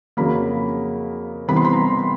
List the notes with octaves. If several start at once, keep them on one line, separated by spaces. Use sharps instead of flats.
F2 C#3 F#3 A#3 B5
C3 E3 G3 B3 B5
C6
B5
A#5